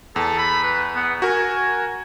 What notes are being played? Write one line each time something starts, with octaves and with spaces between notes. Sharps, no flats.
E2 A4
B5
B4
B3
F#4 A#4 G#5